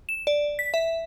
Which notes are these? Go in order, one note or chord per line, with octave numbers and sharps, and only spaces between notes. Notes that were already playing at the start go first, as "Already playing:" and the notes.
E7
D5
B6
E5